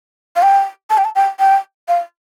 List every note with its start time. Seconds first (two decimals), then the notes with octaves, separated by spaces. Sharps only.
0.36 F5
0.42 G5
0.90 A5
0.97 G5
1.04 A5
1.15 G5
1.39 G5
1.88 F5